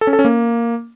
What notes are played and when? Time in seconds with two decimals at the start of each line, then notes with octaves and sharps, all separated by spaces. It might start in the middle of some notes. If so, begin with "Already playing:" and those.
0.01 A4
0.07 C#4
0.13 A4
0.19 C#4
0.25 A#3